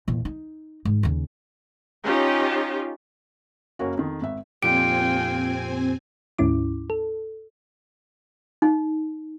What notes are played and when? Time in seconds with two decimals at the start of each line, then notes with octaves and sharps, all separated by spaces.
0.08 E2 A#2
0.25 D#4
0.85 G#2 D#3
1.03 D#2 C#3
2.04 C#4 D#4 F4 G4
3.79 F#1 A#3 C#4 F#4
3.98 F2 D#3
4.22 G#1 E5
4.63 F2 A#2 C4 F4 G4 G5 G#5 D7
6.39 D2 G#2 C#4 E4 D6
6.90 A4
8.62 D#4